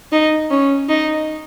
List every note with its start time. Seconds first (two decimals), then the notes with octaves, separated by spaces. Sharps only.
0.12 D#4
0.51 C#4
0.89 D#4